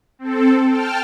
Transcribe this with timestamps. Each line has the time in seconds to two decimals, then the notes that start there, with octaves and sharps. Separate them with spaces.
0.19 C4 A4
0.66 G5 A5 F6